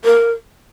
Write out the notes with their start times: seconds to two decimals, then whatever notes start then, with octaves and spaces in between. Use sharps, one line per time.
0.05 A#4